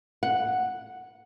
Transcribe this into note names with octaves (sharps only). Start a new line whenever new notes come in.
F#5